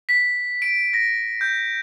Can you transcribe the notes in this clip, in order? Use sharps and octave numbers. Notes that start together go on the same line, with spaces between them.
B6
D7
A#6
G6